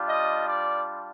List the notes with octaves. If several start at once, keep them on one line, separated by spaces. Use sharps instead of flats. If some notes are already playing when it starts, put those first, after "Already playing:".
Already playing: G3 D4 F4
D#5
D5